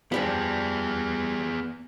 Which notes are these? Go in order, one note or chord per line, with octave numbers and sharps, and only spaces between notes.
F3 G3 B3 D4 G#4